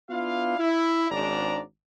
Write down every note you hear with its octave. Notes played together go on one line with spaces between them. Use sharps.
B3 D4 E4 F4 F5
E4
G#1 G#2 C#4 D4 D5 A#5